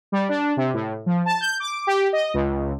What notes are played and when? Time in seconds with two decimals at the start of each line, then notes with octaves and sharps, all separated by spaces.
0.12 G3
0.29 D4
0.57 C3
0.74 A2
1.06 F3
1.26 A5
1.41 G6
1.60 D6
1.87 G4
2.13 D#5
2.34 C#2